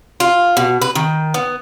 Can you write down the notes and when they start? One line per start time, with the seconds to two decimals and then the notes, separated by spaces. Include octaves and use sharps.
0.20 F4
0.57 B2
0.82 B4
0.95 D#3
1.34 B3